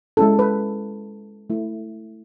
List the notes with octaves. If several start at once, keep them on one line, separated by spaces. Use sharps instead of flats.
G#3 C#4 E4 A4
B4
A3 E4